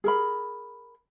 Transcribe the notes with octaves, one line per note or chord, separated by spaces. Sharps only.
G#4 A#4 B5